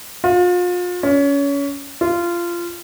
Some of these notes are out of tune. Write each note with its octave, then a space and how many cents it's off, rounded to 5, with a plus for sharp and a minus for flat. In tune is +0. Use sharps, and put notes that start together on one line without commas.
F4 +35
C#4 +25
F4 -20